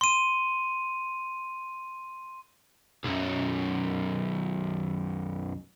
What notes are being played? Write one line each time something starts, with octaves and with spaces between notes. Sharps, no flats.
C6 D#7
B1 F#2